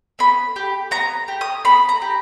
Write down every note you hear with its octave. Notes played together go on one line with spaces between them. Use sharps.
B3 B5
G4
B3 A#5
G4
D#6
B3 B5
A#5
G4